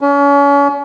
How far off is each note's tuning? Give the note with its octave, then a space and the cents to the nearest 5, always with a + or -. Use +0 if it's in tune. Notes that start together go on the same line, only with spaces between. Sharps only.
C#4 +35